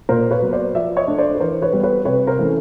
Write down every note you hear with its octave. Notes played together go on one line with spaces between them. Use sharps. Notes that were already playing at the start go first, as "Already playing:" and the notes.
A#2 A#4 C5
B4 C#5
F#3 B3
C5 D5
F3 D5 E5
C#5 D#5
A3 D4
C5 D5
B4
E3 A#4 C5
B4 C#5
G3 B3
B4 C#5
C3 B4 C#5
A#4 C5
E3 A3 C#4